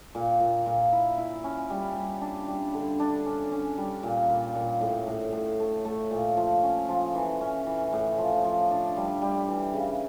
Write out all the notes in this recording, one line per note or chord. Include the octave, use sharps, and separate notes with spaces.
A#2
A#2
A#2
E4
E4
C#4
G3
G3
D4
G3
D3
D4
C#4
C#4
G3
A#2
A#2
A#2
A2
A2
A2
A3
A3
A#2
F3
C#4
F3
E3
C#4
E3
A2
F3
F3
D4
G3
G3
E3
C#3